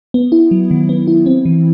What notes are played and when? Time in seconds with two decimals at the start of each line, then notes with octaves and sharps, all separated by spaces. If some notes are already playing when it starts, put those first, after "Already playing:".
0.14 B3
0.32 E4
0.51 F#3
0.71 D#3
0.89 B3
1.07 E4
1.26 C4
1.45 E3